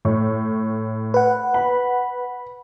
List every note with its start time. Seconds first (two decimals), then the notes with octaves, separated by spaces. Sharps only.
0.05 A2 C#5
1.14 B4 F#5
1.54 B5